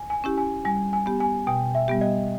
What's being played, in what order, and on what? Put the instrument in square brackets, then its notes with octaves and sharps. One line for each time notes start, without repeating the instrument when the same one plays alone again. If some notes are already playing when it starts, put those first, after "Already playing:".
Already playing: [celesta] G#5
G#5
[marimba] C#4 E4 G4
[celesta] G#5
[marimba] G3 [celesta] G#5
[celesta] G#5
[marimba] B3 G4
[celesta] G#5
[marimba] B2 [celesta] G5
[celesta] E5
[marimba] G3 B3 G4
[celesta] D#5